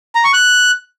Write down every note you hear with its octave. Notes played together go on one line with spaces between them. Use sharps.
A#5
C#6
F#6